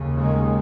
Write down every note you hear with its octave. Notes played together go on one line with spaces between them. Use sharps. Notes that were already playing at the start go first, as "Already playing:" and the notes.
Already playing: D#2 C#3
D#3 G#3